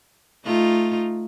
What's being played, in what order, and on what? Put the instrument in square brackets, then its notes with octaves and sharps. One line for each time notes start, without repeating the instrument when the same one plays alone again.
[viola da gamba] A3 D#4 F4